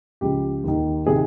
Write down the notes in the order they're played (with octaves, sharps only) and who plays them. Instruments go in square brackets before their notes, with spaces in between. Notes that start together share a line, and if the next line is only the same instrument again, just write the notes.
[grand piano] C#2 C#3 F3 G4
D#2 D#3
C3 D#3 G#4